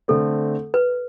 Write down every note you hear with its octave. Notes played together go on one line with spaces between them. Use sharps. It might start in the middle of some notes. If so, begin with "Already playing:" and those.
D3 A3 C4 A4
B4